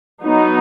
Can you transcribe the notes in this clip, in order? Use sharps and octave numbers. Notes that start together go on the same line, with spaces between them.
F#3 B3 D#4